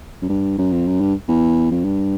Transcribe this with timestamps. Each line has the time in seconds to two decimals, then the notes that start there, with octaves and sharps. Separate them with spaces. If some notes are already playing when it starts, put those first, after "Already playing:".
0.22 F#2
0.29 G2
0.59 F#2
0.72 F2
0.87 F#2
1.01 G2
1.28 E2
1.71 F2
1.85 G2